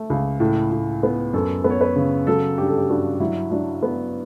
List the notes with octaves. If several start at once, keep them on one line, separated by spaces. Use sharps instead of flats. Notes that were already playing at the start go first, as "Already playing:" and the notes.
Already playing: A3
C#2
A2
A2
B3
F#2 A4
B3
C#5
B4
C#3
F#3 A4
G2 G4
A4
G4
G2 F#4
F#3 E4
F#3 D4
B3